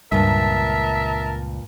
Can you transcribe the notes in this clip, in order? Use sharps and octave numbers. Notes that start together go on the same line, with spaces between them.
C#2 G2 A#2 A#4 E5 A5